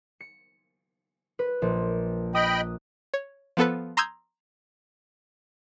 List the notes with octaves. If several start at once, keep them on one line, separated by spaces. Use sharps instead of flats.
C#7
B4
A#1
D#5 G5 B5 D#6 F#6
C#5
F3 B3 A4 B4
A#5 C6 D#6 E6 G6 G#6